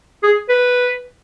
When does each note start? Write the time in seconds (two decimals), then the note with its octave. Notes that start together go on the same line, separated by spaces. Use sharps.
0.23 G#4
0.49 B4